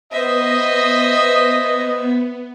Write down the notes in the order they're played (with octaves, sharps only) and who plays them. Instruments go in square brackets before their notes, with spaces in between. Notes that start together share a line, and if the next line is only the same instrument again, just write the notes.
[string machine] B3 [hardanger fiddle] C5 E5 [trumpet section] D#5